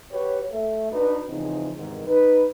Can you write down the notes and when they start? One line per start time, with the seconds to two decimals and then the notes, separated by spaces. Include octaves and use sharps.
0.11 F#4 G4 B4 C#5
0.50 A3 A4 E5
0.91 D4 D#4 F#4 B4
1.28 E2 A2 C#3 F3 C4 D#4
1.76 E2 G#2 C3 D#3
2.07 D#4 B4